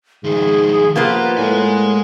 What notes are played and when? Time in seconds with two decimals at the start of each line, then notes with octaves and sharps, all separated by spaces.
0.24 G#2 D#3 F3 G#4
0.96 F3 A#3 B3 F4 G4 B4
1.38 A2 G#3 G#5